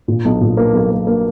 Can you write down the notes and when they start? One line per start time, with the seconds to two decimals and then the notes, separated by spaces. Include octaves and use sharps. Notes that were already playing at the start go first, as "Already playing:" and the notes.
0.08 A#2
0.25 B1
0.41 A#2
0.57 A#3
0.73 B1
0.90 A#3
1.07 A#3